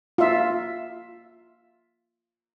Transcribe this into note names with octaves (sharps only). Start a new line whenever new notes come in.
F4 E5